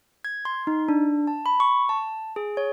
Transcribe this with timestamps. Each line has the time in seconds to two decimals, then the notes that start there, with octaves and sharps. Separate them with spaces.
0.25 G#6
0.45 C6
0.67 D#4
0.88 D4
1.27 A5
1.46 B5
1.60 C#6
1.89 A5
2.36 G#4
2.57 C#5